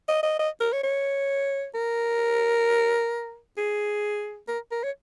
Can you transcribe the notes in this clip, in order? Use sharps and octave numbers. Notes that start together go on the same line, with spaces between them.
D#5
D#5
D#5
A#4
C#5
C#5
A#4
G#4
A#4
A#4
C#5